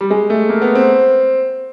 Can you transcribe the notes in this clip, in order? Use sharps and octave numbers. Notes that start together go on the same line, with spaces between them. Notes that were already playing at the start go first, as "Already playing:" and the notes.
G3
G#3
A3
A#3
B3
C4